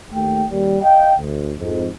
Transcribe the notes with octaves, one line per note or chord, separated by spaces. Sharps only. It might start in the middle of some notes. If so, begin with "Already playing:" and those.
D#2 A3 G5
D#2 G3
D#5 F5 G5
D2
F2 G#2